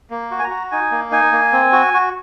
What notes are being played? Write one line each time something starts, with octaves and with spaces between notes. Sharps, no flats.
A#3
F#4
G#5
A#5
F#4
D#4 G#5
A#3
D#4 G#5
A#3
C4
F#4
F#4